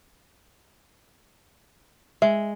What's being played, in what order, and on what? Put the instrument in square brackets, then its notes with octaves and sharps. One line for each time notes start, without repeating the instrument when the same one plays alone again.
[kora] G#3 [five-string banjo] E5